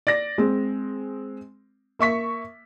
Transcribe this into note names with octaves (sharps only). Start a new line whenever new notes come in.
D5 A#6
G#3 C4
A#3 E5 C#6 B6